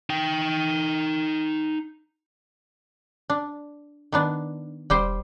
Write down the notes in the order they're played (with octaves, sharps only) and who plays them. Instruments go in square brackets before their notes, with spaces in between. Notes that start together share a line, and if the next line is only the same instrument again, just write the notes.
[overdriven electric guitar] D#4 G5
[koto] D4
D#3 B3 D4
[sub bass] E1 [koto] G3 G4 C5